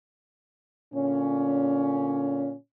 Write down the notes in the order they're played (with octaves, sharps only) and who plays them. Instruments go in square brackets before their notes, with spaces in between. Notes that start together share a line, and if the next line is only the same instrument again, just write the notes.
[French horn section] A#2 D3 C#4